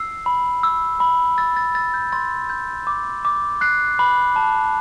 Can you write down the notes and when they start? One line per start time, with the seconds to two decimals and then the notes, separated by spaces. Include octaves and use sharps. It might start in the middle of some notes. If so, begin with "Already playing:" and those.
Already playing: E6 C7
0.26 B5
0.63 E6
1.00 B5
1.38 E6 A6
1.57 A6
1.75 E6 A6
1.94 G6
2.12 C6 A6
2.50 G6
2.87 D6
3.25 D6
3.61 F#6 C7
3.99 B5
4.36 A5